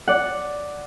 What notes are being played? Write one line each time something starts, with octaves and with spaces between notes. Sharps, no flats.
D5 F#5